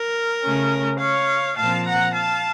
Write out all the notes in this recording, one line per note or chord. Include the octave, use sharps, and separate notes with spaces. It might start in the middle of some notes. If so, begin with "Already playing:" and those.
Already playing: A#4
C#3 A3 C#4
C#5 F5
A#2 F3 C4 F5 A5
F#5 A#5
F5 A5